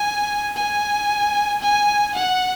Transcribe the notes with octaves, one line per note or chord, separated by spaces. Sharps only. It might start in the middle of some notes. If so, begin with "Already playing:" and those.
Already playing: G#5
G#5
G#5
F#5